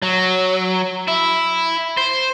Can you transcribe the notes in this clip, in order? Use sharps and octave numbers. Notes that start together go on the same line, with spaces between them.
F#3
E4
C5